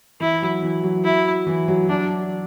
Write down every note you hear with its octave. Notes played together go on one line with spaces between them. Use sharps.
E3 E4
F#3
E3
F#3
E4
E3
F#3
F#3 D4